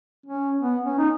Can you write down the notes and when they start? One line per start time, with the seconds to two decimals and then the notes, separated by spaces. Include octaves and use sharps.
0.26 C#4
0.61 B3
0.85 C#4
0.98 D#4